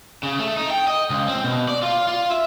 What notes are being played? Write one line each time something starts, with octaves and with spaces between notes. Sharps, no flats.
C#3
A3
D#4
G5
D#5
C#2
C4
B2
D5
F4
F4
E5